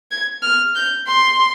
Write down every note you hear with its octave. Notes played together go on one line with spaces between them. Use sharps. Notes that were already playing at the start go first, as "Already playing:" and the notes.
G#6
F6
G6
C6